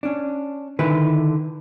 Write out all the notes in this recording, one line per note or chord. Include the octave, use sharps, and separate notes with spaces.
C#4 D4
D3 D#3 E4 B4